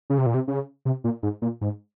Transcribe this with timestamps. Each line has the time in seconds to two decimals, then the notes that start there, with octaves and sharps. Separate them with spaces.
0.10 C#3
0.18 C3
0.26 A#2
0.34 C3
0.48 C#3
0.85 C3
1.04 A#2
1.23 G#2
1.42 A#2
1.61 G#2